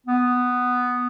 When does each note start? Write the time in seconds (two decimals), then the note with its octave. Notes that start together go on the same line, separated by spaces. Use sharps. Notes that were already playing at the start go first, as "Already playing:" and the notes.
0.06 B3